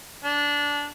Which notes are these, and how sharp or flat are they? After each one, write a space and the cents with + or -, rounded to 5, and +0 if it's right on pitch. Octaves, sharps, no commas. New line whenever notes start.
D4 -15